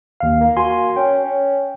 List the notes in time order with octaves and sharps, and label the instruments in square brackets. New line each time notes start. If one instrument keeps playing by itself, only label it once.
[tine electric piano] D#2 F5
[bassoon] A#3
[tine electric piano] F#4 G#5 C6
[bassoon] C#4 [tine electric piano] G5
[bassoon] C#4